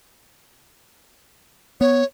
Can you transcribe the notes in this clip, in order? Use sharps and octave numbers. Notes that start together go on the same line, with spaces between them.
B3 C#5